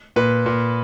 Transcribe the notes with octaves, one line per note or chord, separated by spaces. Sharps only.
A#2 B4
A#2